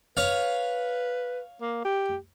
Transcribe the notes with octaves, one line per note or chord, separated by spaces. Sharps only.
B4 C#5 F5
A#3
G4